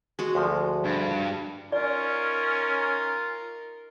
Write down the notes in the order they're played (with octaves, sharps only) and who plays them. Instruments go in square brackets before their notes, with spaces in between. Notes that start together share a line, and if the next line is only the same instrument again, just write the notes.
[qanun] G#3 F#4
[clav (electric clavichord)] D2 F3
[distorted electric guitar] G2
[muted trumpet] C#4 [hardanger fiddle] D#4 A#4 [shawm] F4 [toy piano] D5